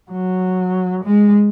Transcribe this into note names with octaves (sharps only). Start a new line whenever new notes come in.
F#3
G#3